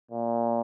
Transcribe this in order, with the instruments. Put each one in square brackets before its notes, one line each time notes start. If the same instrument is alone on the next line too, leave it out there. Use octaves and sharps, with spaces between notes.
[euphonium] A#2